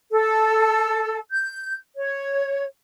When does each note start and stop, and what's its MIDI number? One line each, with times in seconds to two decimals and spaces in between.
0.11 1.18 69
1.31 1.74 91
1.96 2.65 73